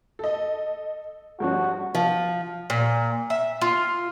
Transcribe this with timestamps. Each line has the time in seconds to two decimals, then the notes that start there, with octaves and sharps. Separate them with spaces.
0.19 A4 D#5
1.40 G2 F3 C#4 F#4
1.95 F3
2.70 A#2
3.30 E5
3.61 F4